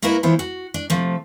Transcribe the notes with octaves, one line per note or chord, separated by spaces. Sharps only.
A#3 E4 F#4 A#4 B4 D#5
E3 B3 E4 F4 C5 C#5
F#4
D4
C3 F3 A3